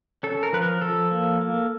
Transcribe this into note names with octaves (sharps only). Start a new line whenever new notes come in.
C#4 A4
A#4
F3 B4
A#4
F3 A4
A#3
A#3